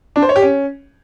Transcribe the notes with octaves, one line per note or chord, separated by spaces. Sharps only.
D4
C5
C#5
G4
C#4